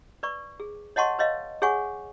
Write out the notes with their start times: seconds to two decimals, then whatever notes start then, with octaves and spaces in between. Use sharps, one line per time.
0.23 B4 D5 C#6
0.60 G#4
0.96 C#5 D#5 F#5 A5 C6 C#6
1.19 B4 C#5 D#5 F5
1.62 G#4 C#5 F#5 G#5 C#6